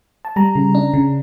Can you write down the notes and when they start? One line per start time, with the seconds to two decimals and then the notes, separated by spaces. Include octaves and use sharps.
0.25 A5
0.36 G3 A#5
0.55 C#3
0.75 D4
0.93 C#3